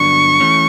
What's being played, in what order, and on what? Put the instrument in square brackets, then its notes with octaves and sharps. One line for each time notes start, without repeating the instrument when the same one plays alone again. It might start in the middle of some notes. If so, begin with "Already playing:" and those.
Already playing: [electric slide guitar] G2 D3 F#3 B3 D4 [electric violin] C#6
[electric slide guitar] E3 A3 C#4